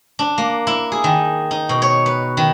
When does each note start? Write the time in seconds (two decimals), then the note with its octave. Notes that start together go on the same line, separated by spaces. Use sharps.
0.19 D4
0.38 A#3
0.67 E4
0.92 G#4
1.04 D#3
1.51 D#4
1.69 B2
1.82 C#5
2.06 B4
2.37 D#3